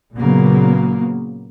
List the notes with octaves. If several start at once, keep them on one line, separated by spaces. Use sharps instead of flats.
A#2 C#3 F#3 A#3 B3